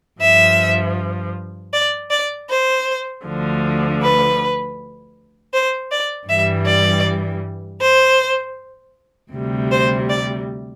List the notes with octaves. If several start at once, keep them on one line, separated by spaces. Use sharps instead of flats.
G2 F3 E5
D5
D5
C5
D2 D3 F3
B4
C5
D5
G2 E3 G3 E5
D5
C5
D2 C3 G3
C5
D5